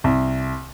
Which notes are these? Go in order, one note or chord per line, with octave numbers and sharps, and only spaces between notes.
C2